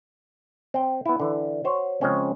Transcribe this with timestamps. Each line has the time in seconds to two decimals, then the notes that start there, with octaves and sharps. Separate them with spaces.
0.74 C4 G5
1.06 B3 E4
1.20 D3 E3
1.64 F#4 C5 C#5
2.01 C#3 F3 G#3 C4 C#4